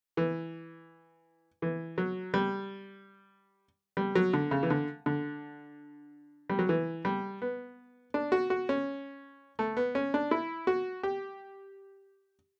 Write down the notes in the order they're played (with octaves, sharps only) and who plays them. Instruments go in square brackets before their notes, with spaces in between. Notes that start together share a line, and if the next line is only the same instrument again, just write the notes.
[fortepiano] E3
E3
F#3
G3
G3
F#3
D3
C#3
E3
D3
D3
G3
F#3
E3
G3
B3
D4
F#4
F#4
C#4
A3
B3
C#4
D4
E4
F#4
G4